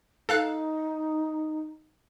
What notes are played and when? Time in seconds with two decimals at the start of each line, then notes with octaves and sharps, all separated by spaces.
0.29 D#4 A4 F5 F#6